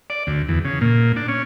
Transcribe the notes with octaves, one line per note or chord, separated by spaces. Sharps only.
D5
D2
E2
C#3
A#2
D4
C#4